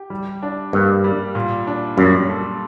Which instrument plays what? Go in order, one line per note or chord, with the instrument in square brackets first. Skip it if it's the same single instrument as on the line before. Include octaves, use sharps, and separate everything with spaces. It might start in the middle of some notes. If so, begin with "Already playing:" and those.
Already playing: [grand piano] G4
G3
D4
[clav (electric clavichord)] G2 [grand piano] A#3
[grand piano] G3
A#2
D4
[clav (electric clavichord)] F#2 [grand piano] G3
[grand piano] A4